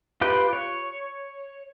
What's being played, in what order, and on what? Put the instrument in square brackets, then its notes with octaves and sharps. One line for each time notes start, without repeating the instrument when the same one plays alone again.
[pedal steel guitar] F4 G4 B4 G5
C#5